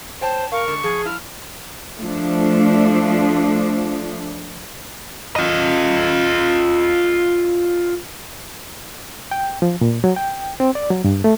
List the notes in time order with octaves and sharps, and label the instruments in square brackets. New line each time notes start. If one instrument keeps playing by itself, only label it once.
[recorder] C5 [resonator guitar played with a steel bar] C#5 G5 A5
[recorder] A#4 [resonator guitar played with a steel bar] F5 [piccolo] C#6
[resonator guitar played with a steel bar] D3 G#3
[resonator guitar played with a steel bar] F3 [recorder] G#4
[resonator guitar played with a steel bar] F3 E4 [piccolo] F6
[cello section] F3 A3 D4
[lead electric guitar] F4 D#5
[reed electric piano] G5
F3
A#2
F#3
G5
C4
D5
F#3
G2
A3